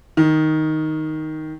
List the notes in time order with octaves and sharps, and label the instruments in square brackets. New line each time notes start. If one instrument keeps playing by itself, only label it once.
[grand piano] D#3